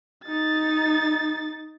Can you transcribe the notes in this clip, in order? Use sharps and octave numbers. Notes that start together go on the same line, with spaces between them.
D#4 A6